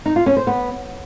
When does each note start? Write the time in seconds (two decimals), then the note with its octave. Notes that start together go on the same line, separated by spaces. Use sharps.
0.06 D#4
0.16 F4
0.26 C#4
0.37 C5
0.47 B3